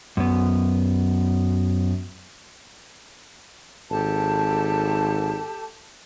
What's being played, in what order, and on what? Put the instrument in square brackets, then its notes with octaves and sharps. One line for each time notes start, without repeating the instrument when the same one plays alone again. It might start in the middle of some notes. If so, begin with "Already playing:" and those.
[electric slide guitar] F#2 B3
[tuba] G#1 [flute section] G4 A4 A5